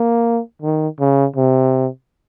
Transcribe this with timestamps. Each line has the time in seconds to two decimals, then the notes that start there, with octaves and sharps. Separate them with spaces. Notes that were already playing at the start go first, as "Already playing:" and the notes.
Already playing: A#3
0.62 D#3
1.00 C#3
1.36 C3